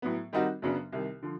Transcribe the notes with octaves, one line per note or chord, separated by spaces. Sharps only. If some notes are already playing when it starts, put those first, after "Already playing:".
A2 F#3 B3
D#3 G3 C4 D#4 F#4
F#2 C#3 F#3 B3 D4
C2 C3 D#3
D3 F3